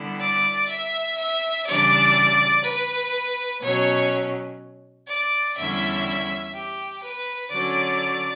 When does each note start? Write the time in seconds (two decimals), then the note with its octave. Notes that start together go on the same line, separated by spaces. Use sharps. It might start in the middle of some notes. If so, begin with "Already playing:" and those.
Already playing: D3 G3 B3 E4
0.20 D5
0.69 E5
1.18 E5
1.67 C#3 E3 G3 D4 D5
2.64 B4
3.61 B2 F#3 C#4 C#5
5.08 D5
5.57 E2 D3 G3 C#4 E4 E5
6.54 G4
7.03 B4
7.51 D3 F#3 C#4 D5